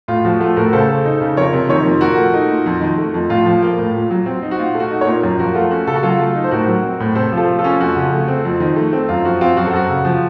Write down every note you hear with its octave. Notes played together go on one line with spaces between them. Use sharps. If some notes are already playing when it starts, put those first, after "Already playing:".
A2 F4
F3 F#4
A3 F4 A4
A2 F#4 A#4
C#3 A4 C5
A3
D#4
C#3
F2 A#4 C#5
C3
D#3 A#4 C#5
F2
A#2 F#4 A#4
A3
D#4
A#2
F2
D#3
A3
F2
A2 F4
F3
A#3
A2
A#2
F#3
C4
D#4
F#4
A#2 F4
A3
F#4
D#4
A#4 C#5
A#2
F#2
F3 F#4 A#4
A3 F4
C#4 F#4
C#3 A4
F#4
F#3 F4 A4
A3
D#4
C5
A2 F#4 A#4
F#3
C4
A2
C3 A4 C5
F3
F4 A4
A3
F4 A4
C#4
F2 F#4
C#3
A3
C4
F2
D#3
A3
C4
F#2 F4
F3 F#4
C4 F4
F#2 F#4
A4
F#2 F#4
C#3
F3